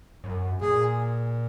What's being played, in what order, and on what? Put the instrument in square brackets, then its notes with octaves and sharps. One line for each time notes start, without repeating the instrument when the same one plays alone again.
[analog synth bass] F#2
[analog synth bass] A#2 [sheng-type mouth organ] G#4